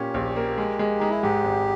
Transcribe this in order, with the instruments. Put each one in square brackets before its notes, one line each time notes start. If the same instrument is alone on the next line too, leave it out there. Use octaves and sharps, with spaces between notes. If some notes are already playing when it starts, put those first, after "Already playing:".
Already playing: [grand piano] A#2 A#3 C#4 [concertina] G4
[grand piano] A#1
A#3
G#3
G#3
[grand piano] G#3 [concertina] D#4
[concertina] E4
[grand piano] G#2 [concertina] G4
[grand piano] G#1